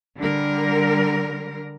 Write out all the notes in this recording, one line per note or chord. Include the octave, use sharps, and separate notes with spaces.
D3 G3 A#4